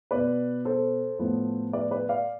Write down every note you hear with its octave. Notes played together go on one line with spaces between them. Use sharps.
B2 B3 B4 D5
A4 C5
A2 F3 B3
B4 D5
B4 D5
D5 F5